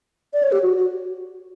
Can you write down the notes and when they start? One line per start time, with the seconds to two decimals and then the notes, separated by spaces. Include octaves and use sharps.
0.33 D5
0.43 C#5
0.52 G4
0.62 F#4
0.76 F#4